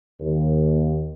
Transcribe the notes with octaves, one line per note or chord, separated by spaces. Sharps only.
D#2